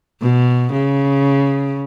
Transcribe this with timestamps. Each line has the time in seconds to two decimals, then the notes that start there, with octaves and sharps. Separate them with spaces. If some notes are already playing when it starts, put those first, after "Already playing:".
0.22 B2
0.72 C#3